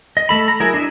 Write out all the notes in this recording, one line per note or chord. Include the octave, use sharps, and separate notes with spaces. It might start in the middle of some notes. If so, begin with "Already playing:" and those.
D#5
A3 A4 B5
A#5
F#3 E4 G#4 A#4
D4 E4 D#5 E5